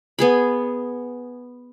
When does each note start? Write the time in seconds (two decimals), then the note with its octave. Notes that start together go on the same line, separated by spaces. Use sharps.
0.19 B3 G#4 B5